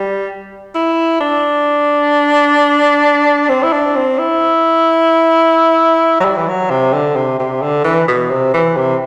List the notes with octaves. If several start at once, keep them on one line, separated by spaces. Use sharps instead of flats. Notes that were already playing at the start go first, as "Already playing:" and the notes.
Already playing: G3
E4
D4
C4
E4
D4
C4
E4
F#3
G3
E3
F#3
C3
D3
C3
C3
D3
E3
B2
C3
E3
C3